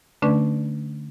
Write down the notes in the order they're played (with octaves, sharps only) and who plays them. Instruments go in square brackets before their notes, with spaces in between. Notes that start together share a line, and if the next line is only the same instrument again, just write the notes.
[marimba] D3 A3 C#4 D4 B4 D5